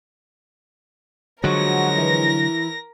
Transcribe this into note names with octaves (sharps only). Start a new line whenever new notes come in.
D3 F3 F#3 G#3 F#4 A#4 C#5 A#6
E3